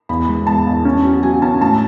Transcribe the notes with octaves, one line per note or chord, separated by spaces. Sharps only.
E2 B5
G#3
E2 A5
E2
C#4
F#3
F#3 G#5
C#4 A5
A2 A5